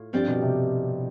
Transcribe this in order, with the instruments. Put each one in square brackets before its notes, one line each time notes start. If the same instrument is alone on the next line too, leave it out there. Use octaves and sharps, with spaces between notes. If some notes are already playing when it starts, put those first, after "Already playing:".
Already playing: [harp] A2 F4
[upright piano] G2 [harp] F3 C4 G4 D5
[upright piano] B2
C3